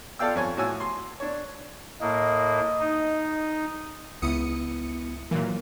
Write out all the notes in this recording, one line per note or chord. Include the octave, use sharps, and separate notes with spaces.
F4 A4 D5 F5 G5 E6
F2 C#5 G#5
A2 F#4 C#5 G#5 E6
C6
D4 C#5
A2 A#3 D#5
D#4
C#2 B3 E4 E5 D#6 C#7
A#2 E3 F#3 A#3